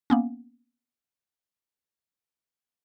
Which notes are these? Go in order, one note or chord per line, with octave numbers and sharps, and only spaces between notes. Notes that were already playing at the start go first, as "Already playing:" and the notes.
A#3 B3 C#4